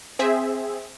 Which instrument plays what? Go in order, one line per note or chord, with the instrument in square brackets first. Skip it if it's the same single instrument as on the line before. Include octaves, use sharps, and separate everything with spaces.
[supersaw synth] C4 G#4 E5